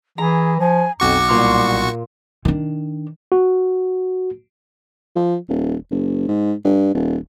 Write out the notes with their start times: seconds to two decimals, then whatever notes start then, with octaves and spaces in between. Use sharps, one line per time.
0.18 E3 G#4 A#5
0.60 F3 G#5
1.00 B1 F2 F#4 C#6 D6
1.28 C2 A#2 C6 F6
2.45 D#3 D4
3.32 F#4
5.16 F3
5.49 D#1
5.91 F#1
6.28 G#2
6.65 G2
6.94 D#1